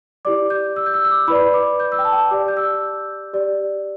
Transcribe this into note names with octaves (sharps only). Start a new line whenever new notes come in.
E4 G4 D5 D6
G6
E6
G6
E6
E6
D6
E4 B4 D5 B5
D6
G6
E6
G5
A5
G5
A5
G4 D5 D6
G6
E6
G4 D5